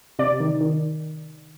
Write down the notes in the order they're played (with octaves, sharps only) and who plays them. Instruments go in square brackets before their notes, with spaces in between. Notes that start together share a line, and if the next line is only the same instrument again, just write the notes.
[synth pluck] C3 D5
D#3
D#3